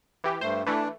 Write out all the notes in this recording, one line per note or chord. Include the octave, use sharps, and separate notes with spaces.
E3 G4
G2 A3 C5
E3 A3 D4